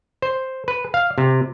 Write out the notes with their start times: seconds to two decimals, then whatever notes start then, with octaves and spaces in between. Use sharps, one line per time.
0.22 C5
0.68 B4
0.94 F5
1.18 C3